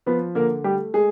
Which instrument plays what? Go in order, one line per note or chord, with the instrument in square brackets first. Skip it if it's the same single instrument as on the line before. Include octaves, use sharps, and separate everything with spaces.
[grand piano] F3 B3 B4
D3 A#3 A#4
G3 A3 G4
G#3 G#4